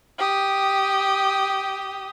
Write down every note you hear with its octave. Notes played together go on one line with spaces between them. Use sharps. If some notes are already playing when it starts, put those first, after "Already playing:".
G4 D#6